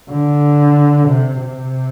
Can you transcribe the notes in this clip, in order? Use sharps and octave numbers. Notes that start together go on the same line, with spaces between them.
D3
C3
C3